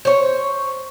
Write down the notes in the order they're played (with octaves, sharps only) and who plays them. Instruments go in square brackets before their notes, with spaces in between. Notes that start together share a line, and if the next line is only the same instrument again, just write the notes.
[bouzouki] C5 C#5